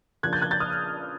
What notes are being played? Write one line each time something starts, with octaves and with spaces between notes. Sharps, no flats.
C#3 F3 A#3 D4 F#6 G#6
G6 A6
F#6 G#6
G6 A6
D#6 F6